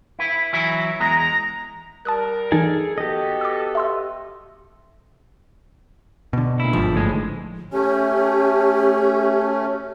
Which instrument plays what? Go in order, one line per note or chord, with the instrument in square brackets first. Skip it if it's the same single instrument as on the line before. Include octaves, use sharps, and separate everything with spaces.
[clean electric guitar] E4 B4
E3 F#3 E4
[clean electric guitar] E2 G#3 [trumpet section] A#5
[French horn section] G3 A#4 [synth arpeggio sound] A5 D#6 F#6
[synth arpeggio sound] E3 D#4 [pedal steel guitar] G#4 A4 G#5
[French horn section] B3 F#4 A4 [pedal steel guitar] G4 D#5
[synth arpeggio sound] D6 E6
E5 C6 E6
[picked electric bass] B2 D3
[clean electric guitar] A#2 E4
[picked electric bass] G1 G#2 [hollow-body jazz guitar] F3
[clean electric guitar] D2 A2 G#3
[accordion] A3 C#4 [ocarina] G4